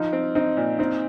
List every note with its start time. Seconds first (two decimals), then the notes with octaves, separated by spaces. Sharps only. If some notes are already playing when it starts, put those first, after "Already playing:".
Already playing: F3 D#4
0.13 C4
0.35 C4 D#4
0.57 A#2
0.79 C4 D#4